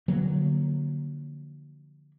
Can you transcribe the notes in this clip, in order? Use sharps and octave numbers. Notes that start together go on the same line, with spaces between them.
D3 F3 F#3 A#3